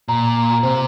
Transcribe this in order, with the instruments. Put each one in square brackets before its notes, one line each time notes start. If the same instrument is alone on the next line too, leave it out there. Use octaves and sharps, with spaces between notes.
[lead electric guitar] A#2 [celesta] A#5
[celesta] A#5
A#5
[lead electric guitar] C3 [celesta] C5